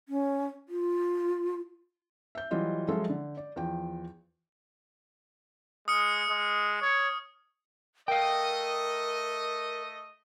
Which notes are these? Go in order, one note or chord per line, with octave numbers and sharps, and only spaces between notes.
C#4
F4
E5 G6
E3 F#3 G3 F4 D#5
F3 F#3 G#3 F4 A4 E5
D3
D5
E2 F3 G5
G#3 D#6 F6 C#7
G#3
C#5
A3 A#4 D#5 F5 G5